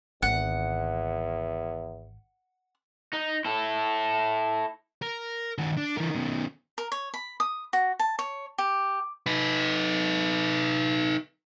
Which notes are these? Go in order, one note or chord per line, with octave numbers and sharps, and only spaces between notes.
G#1 E2 F#5
D#4
E4 A4
A#4
D#3 F#4
D4
E3 A#4
B2 D#3
A#4
C#5
B5
D#6
F#4
A5
C#5
G4
D#4 B4